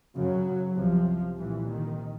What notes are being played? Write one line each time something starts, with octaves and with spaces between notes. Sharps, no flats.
F#2 C#3 F#3
C2 C3 F3
C2 A#2 E3
D#3